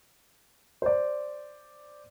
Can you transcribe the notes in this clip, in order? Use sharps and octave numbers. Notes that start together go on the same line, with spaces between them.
C5 D5